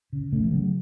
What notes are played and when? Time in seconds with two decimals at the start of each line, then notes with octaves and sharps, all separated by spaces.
0.13 C#3
0.32 C#3 A3
0.43 E3
0.52 C#3 F#3